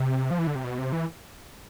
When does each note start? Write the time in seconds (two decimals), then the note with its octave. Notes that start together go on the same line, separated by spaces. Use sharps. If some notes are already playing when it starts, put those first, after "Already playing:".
Already playing: C3
0.31 F3
0.39 E3
0.47 D3
0.55 C3
0.64 B2
0.78 C3
0.93 E3